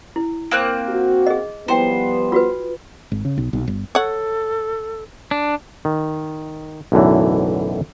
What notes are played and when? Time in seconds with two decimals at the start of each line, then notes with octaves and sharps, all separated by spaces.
0.16 E4
0.51 A#3 C4 F#6
0.88 F#4
1.26 G#4 D#5
1.68 F3 G3 B3 E4 C5 G5
2.32 F4 F#4 B4
3.12 G#1
3.25 C#3
3.37 B1
3.53 B1
3.68 G1
3.95 A4 C#5 F#5
5.31 D4
5.85 D#3
6.92 B1 F#2 A2 D3 E3